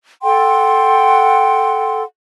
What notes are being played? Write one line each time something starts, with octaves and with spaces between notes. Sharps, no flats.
A4 F#5 G5 C6